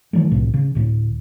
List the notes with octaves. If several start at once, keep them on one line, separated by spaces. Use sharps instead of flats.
D#3 E3 F#3 A3
C2 A2 C3
C#3
D2 A2